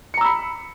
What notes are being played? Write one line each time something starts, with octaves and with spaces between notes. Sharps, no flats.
A#5 B5 E6 C#7